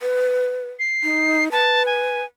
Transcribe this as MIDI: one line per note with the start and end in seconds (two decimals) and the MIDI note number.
0.02 0.70 71
0.79 1.44 96
1.03 1.51 63
1.52 2.21 71
1.52 1.83 81
1.86 2.25 80